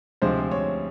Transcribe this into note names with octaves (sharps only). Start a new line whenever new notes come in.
D2 C3 F3 G#3 C5
C#5